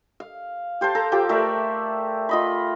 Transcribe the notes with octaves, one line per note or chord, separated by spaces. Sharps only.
F5
G4 C5 F5 A5
A4 A#5
F3 G4 D6
A3 A#4 D5 E5
F4 D#5 B5